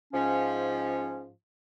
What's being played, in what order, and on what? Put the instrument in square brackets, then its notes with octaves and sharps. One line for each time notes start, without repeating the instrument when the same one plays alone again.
[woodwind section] G#2 F3 C#4